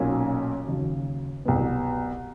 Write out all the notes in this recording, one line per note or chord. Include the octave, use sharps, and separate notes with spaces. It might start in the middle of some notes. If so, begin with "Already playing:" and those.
Already playing: B1 A#2 F#3 A#3 C#4
D#2 C#3 F#3
C2 B2 F#3 B3